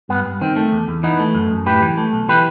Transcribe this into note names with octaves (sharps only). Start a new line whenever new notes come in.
G2 B3
G2
D#3 C4
A3
E2
E2
E3 B3 D#4
A3
F#2
F#2
A2 G4 B4
E3
A3
B1
E3 G4 B4